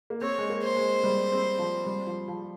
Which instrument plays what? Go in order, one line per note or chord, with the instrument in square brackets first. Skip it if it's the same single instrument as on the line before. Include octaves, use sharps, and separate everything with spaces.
[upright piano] A#3
[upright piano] C4 [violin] C#5
[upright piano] G#3
A#3
[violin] C5
[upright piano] G#3
G3
C4
F3
G3
F3
F3